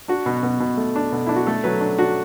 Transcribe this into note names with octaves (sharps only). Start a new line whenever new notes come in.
D4 F#4
B2
B2
B2
A3
D4
B2
D4 E4
F#4
A3 A4
F#3 B4
D4
D4 F#4